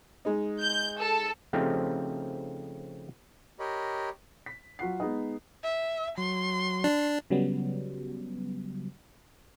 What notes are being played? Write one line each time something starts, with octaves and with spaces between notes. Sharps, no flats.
G#3 D#4
G6
A4
C#3 F3 A3 C4 D#4 G4
G4 A#4 C#5 D#5 B5
B6
F#3 F4 F#5 C7
G#3 B3 D#4 D#5
E5
F#3 C6
D4
C#3 F#3 G3 B3